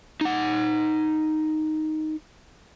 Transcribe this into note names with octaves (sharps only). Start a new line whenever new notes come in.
D#4 F#5